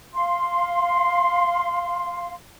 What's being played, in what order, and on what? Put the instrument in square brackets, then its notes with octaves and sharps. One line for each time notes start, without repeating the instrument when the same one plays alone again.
[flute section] F5 C6